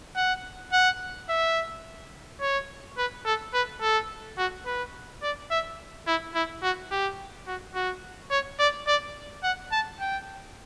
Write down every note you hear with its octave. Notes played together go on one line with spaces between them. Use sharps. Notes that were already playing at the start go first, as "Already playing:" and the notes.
F#5
F#5
E5
C#5
B4
A4
B4
A4
F#4
B4
D5
E5
E4
E4
F#4
G4
F#4
F#4
C#5
D5
D5
F#5
A5
G5